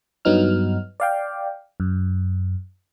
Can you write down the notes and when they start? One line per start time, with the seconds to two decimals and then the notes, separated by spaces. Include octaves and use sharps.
0.25 G2 F#3 B3 D#4 F6
1.00 D5 F5 G5
1.80 F#2